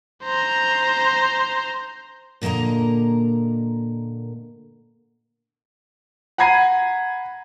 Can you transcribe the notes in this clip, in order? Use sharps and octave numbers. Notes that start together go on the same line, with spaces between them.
C5 A#5
A#2 D3 A#3 D#5 A#5
F#5 A#5 B5 G#6 C7 D#7